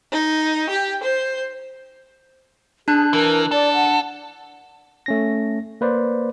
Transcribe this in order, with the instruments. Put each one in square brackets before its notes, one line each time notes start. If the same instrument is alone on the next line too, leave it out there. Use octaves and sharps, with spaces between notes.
[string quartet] D#4
G4
C5
[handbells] D4 A5 F#6 [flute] G#4
[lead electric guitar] E3 [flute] A#4
[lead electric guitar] A4 [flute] D5
[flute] F#5
[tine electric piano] A3 C#4 A#6
A#3 B4 C5 D5